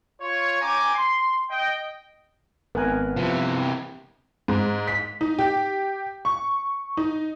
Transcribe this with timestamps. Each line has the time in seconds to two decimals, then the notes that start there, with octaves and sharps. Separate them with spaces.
0.20 F4 C#5
0.61 C#4 G5 G#5 A#5 D6
0.94 C6
1.49 D#5 G5
2.75 G#1 B3 A#4 G#5 F#6
3.16 C3 E3 F3
4.48 G#2
4.88 B6
5.21 D#4
5.39 G4
6.25 C#6
6.97 D#4